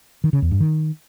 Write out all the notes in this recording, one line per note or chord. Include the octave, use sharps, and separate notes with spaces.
D#3
C#3
E2
G2
D#3